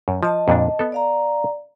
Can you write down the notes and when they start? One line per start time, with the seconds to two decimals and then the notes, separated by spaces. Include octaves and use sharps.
0.08 F#2
0.23 F3 D#5 A5
0.48 F2 A#2 D4
0.79 B3 A4
0.92 D5 F5 A#5